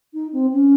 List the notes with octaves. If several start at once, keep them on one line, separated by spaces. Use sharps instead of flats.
D#4
C4
C#4